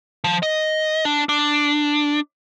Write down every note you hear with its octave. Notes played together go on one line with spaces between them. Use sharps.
F3
D#5
D4
D4